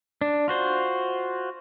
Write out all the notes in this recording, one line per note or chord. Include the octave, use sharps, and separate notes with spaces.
D4
F4 F#4 C5